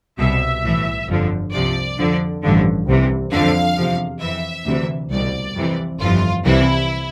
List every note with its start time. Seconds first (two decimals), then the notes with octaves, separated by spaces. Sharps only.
0.18 C2 B2 E5
0.64 B1 A2 E3
1.08 G1 F2 D3 F3
1.53 C2 C3 F3 D5
1.98 F2 D3 F3
2.42 A1 G2 D3 F3
2.87 C2 C3 E3
3.31 F2 D3 F3 F5
3.77 E2 C3 F3
4.21 F2 E3 E5
4.66 D2 C3 E3
5.11 C2 B2 D5
5.55 F2 C3 E3
6.00 G1 F2 E3 F4
6.45 C2 C3 E3 E4